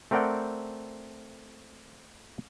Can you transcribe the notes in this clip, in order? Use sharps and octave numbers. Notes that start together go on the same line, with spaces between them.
A3 C4 A#4 D5 F#5 G5